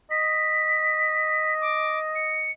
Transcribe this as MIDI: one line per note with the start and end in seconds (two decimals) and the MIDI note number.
0.11 2.53 75
0.11 1.54 95
1.61 1.99 86
2.15 2.51 97